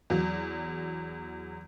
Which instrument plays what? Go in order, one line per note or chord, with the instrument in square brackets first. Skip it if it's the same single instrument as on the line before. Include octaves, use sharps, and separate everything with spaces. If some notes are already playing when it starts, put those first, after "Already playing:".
[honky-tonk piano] E2 F#3